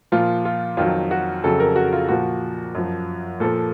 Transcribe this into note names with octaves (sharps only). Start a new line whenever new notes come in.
A#2 F3 F4
F4
F2 D#3 F#3 F4
F#4
F2 C#3 F#3 A4
A#4
F#4
F4
A#2 F3 F#4
F#2 F3
A#2 F3 A4